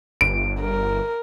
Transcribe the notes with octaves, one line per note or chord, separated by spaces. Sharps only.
G1 D7
A#4